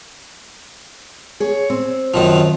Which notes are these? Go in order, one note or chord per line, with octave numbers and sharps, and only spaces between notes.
G#4 C#5
C4
F#2 D#3 F3